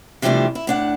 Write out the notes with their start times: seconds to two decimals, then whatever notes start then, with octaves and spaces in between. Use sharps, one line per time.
0.22 C3 E3 F3 G3 A3 D4
0.55 E4
0.67 A2 D4 F#5